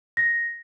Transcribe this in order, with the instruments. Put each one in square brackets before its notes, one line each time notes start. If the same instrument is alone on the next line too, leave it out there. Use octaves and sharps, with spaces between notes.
[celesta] A#6